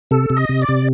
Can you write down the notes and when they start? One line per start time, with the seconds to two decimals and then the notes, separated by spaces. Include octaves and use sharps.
0.11 C3 A4
0.30 C3
0.37 D#5
0.49 C3
0.62 D5
0.69 C3